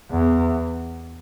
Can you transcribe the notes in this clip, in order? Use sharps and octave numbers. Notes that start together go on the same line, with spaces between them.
E2